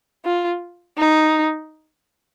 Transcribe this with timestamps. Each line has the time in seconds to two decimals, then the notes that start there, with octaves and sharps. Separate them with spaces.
0.25 F4
0.98 D#4